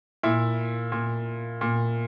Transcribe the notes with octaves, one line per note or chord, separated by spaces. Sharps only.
A#2 E4
A#2
A#2